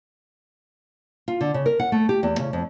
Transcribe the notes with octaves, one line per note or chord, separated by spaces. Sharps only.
F4
D3
C#3
A#4
F#5
A3
G4
E2
C#3
F2